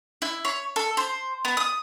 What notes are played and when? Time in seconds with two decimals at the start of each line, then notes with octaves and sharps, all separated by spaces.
0.22 E4
0.45 C#5
0.76 A4
0.97 C5
1.45 B3
1.57 D#6